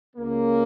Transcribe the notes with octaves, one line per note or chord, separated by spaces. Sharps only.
C#2 C#3 A#3